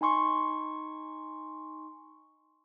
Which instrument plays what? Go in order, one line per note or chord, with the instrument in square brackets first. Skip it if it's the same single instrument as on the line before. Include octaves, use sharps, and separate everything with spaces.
[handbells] D#4 G#5 C6 C#6